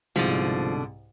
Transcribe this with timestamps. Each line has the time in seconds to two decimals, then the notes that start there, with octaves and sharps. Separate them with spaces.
0.16 C2 G#2 B2 D3 F3